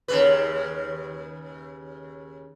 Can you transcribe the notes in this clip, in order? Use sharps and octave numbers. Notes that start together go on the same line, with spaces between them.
D#2 C#3 B4